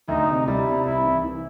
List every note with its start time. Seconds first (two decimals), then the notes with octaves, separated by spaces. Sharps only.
0.08 D2 D#4
0.28 C3
0.47 G3 E4
0.66 C3
0.85 C2 E4
1.04 E3
1.23 E3